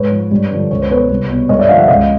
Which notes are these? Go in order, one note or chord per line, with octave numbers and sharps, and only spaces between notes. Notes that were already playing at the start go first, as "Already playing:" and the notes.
Already playing: G#2 B4 C#5
F3
G2
D3 F3
C#2 C#5
C5
B2 B4 C#5
C2
B2
G2 C#5 D#5
D5 E5
D3 F3 D#5 F5
E5 F#5
C#2 D#5 F5